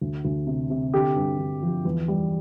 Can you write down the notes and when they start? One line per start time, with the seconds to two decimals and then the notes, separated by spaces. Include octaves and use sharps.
0.01 D2
0.25 D2
0.47 C3
0.70 C3
0.94 D3 G4
1.16 G2
1.38 D3
1.62 F3
1.85 E2
2.08 G3